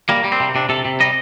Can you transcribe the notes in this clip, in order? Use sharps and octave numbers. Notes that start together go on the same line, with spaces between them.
G3 A#3
G3
C4
C3
C3 D4
C3 A4
C3
G3 D#5